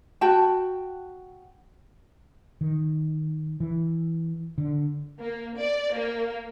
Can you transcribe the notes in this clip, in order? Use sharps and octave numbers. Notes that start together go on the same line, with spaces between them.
F#4 G5 A5
D#3
E3
D3
A#3
D5
A#3